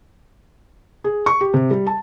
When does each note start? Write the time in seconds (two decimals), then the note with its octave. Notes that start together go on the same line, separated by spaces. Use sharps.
1.04 G#4
1.26 C#6
1.41 G4
1.54 C3
1.71 G3
1.87 A5